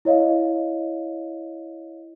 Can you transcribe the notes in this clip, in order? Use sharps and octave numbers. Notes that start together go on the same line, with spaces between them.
E4 C#5 D#5 F5